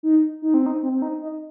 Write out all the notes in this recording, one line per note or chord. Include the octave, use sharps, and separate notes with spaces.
D#4
D#4
C4
D#4
C4
C4
D#4
D#4